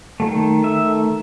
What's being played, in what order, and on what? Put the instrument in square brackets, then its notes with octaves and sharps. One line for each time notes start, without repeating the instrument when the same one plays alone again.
[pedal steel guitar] D#3 F#3 A3
E5